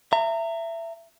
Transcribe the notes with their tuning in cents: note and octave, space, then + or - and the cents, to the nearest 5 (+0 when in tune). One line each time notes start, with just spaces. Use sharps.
E5 +20 A#5 -30